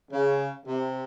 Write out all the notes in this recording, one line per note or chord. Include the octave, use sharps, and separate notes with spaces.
C#3
C3